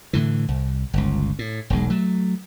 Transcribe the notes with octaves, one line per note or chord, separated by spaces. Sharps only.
A2 D3 E3
C2
G1 C#2
A2
E1 B1 G#3
F#3 A3